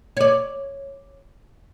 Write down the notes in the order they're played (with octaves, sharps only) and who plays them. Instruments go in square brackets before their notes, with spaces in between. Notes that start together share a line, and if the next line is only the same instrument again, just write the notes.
[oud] C#5 D5